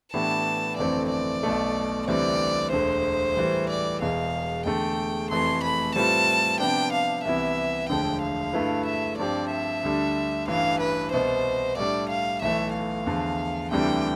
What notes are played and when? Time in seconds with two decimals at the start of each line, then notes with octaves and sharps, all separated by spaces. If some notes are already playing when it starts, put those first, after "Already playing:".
0.14 A2 E3 B3 D4 G4 A5
0.78 G1 F2 E3 A3 C4 D5
1.10 D5
1.43 B1 B2 A3
2.07 D2 C3 E3 G3 C4 D5
2.72 E1 D2 D3 C5
3.37 A2 E3 G3
3.70 D5
4.01 E1 E2 B2 F5
4.66 E2 D3 A3 G5
5.31 F1 F2 E3 A3 C6
5.64 B5
5.96 A2 G3 C4 F4 B4 A5
6.60 C3 F3 B3 D4 G5
6.93 F5
7.24 C2 C3 E3 B3 E4 E5
7.90 E1 D2 D3 F3 G5
8.22 F5
8.53 G2 D3 A3 E4 B4
8.86 E5
9.18 G2 F3 C4 G4 C5 D5
9.51 E5
9.83 D2 D3 G3 D4
10.47 A1 G2 E3 F5
10.80 B4
11.12 C2 B2 B3 C5
11.77 A2 G3 D4 D5
12.10 F5
12.42 B1 A2 E3 A3 E5
12.74 F5
13.07 E2 D3 F3
13.71 D2 C3 E3 G3 D4 G5